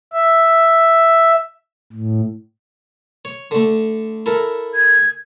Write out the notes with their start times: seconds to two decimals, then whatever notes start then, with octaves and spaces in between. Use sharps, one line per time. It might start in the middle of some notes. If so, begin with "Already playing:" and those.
0.13 E5
1.93 A2
3.25 C#5
3.51 D3 A3
4.26 E4 A4 A#4
4.75 G#6